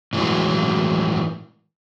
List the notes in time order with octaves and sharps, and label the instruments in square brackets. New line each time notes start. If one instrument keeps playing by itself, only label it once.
[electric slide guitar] A2 E3 F#3 G#3